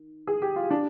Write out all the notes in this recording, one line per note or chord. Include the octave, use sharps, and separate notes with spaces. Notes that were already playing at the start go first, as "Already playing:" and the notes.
Already playing: D#3
G#4
G4
F4
D4